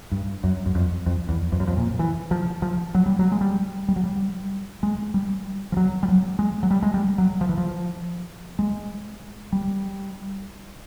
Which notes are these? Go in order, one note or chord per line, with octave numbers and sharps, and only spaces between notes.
G2
F#2
F#2
F2
F2
E2
F2
F#2
F2
A#2
E3
F3
F3
F#3
G3
F#3
G#3
G3
G3
F#3
G3
G#3
G3
F3
F#3
G3
F#3
G#3
F#3
G3
G#3
G3
F#3
F3
E3
F3
G#3
G3